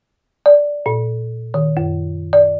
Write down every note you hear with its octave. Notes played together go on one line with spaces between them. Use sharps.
D5
A#2
D#3
F#2
D5